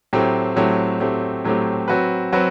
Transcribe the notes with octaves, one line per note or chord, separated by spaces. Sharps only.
A2 F#3 A3 C4 G4
A2 F#3 A3 C4 G4
A2 F#3 A3 C4 G4
A2 F#3 A3 C4 G4
F#3 C4 F#4 B4
F#3 C4 F#4 B4